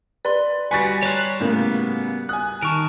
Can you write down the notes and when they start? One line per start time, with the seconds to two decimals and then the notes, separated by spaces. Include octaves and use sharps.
0.25 B4 D5 C6
0.71 G3 F#4 B4 G#5 A6 C#7
1.03 C#5 A5 A#5 C6 F#6
1.40 A2 C#3 A#3 B3
2.29 G#5 D#6 F#6
2.62 D#3 A#4 A5 C#6 D7